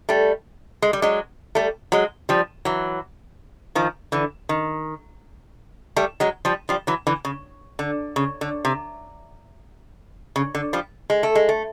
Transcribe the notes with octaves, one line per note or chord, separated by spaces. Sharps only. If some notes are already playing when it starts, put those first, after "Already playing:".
G3 A3
G#3
G3
F#3 G#3
G3 A3
F#3 G#3
F3 G3
E3 F#3
D#3 F3
D3 E3
D#3
G3 A3
F#3 G#3
F3 G3
F3 G3
E3 F#3
D3 E3
C#3
D3
C#3
D3
C3
C#3
D3
F3 G3
G#3
A3
G#3
A3